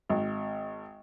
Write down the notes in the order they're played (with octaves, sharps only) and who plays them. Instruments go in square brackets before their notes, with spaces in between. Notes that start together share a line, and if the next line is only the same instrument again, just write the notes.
[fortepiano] G#1